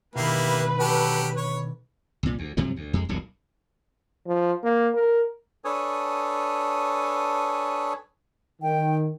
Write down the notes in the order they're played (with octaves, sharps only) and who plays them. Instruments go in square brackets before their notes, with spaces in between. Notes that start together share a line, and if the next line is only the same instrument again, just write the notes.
[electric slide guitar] B2 D3 D#3 [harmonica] A#3 E4 G4 [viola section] B4
[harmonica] F#3 G4 A4
C#5
[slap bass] C2 A#2
D2
G2 C3 F3 F#3
D2
F2 G#3
D#1 B1 A#2
[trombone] F3
A#3
A#4
[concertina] D4 A4 B4 C#5 G#5 D#6
[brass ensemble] D#3 [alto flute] G5